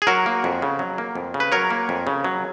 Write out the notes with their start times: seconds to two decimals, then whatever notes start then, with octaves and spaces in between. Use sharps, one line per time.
0.02 G#4
0.07 F#3 F#4 A#4
0.26 A#3
0.44 F2
0.62 C#3
0.79 F#3
0.98 A#3
1.15 F2
1.34 C#3
1.40 B4
1.52 F#3 A#4 C#5
1.70 A#3
1.89 F2
2.07 C#3
2.24 F#3